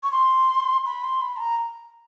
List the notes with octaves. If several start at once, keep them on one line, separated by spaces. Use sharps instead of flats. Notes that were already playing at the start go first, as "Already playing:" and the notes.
C#6
C6
B5
C6
B5
A5
A#5